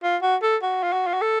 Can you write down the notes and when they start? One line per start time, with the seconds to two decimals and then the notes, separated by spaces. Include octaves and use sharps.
0.03 F4
0.22 F#4
0.42 A4
0.62 F#4
0.83 F4
0.93 F#4
1.07 F4
1.14 F#4
1.21 A4